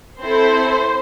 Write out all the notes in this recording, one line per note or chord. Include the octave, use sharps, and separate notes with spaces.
C4 E4 A4 C5